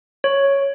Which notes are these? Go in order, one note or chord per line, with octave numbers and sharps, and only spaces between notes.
C#5